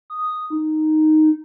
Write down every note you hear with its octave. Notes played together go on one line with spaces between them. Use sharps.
D#6
D#4